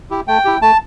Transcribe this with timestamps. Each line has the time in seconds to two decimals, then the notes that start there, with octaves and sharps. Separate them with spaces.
0.10 E4 G4
0.28 A3 G5
0.45 E4 G4
0.61 A3 A5